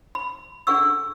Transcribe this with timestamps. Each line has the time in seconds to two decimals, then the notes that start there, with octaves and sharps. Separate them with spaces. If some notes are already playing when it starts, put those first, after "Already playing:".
0.15 B5
0.67 D4 G#4 A4 F#5 C#6 E6